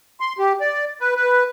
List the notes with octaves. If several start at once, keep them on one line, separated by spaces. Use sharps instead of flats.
C6
G4
D5
B4
B4